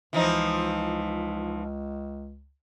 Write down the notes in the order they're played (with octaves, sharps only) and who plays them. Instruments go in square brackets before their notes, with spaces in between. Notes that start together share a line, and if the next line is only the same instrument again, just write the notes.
[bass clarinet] C#2 [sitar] E3 F3 D#4